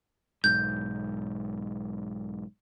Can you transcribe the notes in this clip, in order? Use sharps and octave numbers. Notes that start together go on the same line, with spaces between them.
B1 G#2 G6